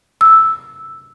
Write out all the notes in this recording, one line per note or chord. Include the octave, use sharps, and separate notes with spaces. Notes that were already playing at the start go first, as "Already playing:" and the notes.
E6